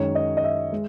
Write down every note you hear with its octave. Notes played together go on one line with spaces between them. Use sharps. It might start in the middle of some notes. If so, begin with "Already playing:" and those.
Already playing: F#2 D#3 G#3 C#5
D#5
D#5
E5
G#3